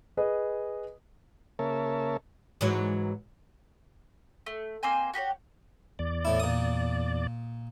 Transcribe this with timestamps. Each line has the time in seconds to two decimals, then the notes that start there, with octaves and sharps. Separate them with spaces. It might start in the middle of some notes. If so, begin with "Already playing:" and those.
0.17 G#4 B4 D#5
1.59 C#3 A#3 A#4 C#5 E5 A5
2.61 G#2 E3 F#3
4.46 A3
4.83 A#3 C4 C5 G#5
5.14 F#4 G4 C5 C#5
5.99 E2 D5
6.25 A2 E4
6.40 A#2 D#6